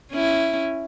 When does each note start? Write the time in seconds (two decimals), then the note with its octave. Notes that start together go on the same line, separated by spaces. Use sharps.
0.11 C#4 E4